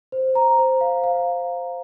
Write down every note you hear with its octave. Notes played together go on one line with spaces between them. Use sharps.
C5
A#5
C5
F5
F5